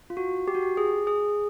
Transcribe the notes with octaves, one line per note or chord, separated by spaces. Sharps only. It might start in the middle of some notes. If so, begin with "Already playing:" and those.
F4
F#4
G4
F#4
G4
G#4
G#4